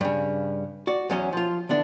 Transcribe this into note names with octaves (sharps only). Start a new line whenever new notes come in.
G2 C#3
F#4 D5
E2 F#3 C#4 D#5
F3 F4
D3 E3 B3 D4